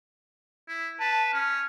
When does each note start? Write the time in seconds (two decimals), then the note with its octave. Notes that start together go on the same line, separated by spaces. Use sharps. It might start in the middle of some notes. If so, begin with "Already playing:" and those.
0.68 E4
1.00 B4 A5
1.34 C#4 F6